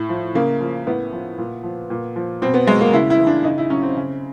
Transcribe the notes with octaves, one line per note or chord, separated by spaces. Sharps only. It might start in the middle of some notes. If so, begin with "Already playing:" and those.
Already playing: A2
F3
C#3 A#3
F3
A2 B3
F3
A#2
F3
A#2
F3
B2 C4
B3
F#3 G#3
A#3
C#3 E4
E4
E3
D4
C#3 D#4
E4
F#3 C#4
C4
C#3